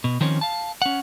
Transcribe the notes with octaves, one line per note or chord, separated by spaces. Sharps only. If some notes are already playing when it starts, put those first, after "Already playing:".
B2
D#3 F3 C4 C#4
F5 A5
C#4 F#5